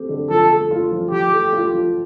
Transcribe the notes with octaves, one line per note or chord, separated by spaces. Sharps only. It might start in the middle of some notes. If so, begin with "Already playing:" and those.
Already playing: A3 C4 G4
D3
F3 A4
A3
F4
F3
F3 G4
A3
F4
F3